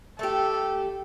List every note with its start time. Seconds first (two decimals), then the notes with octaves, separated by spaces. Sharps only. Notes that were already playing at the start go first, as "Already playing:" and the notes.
0.19 A3 G4 A4